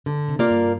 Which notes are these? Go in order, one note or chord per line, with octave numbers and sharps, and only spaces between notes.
D3
C3
A#3 F4 A#4 D5
G2